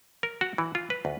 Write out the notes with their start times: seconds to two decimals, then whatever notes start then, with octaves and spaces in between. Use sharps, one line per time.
0.23 A#4
0.41 F#4
0.58 E3
0.75 F4
0.90 B4
1.05 D2